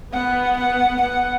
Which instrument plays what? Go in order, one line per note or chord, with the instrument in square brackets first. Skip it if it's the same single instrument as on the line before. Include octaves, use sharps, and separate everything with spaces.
[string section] B3 [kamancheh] F#5
[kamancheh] F#5
[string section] B3 [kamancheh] F#5